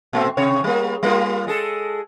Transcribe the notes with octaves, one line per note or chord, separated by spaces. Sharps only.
A#2 A3 C4
C3 C#5
G3 A#3
G3 A#3 F4
G#3 G#4 A4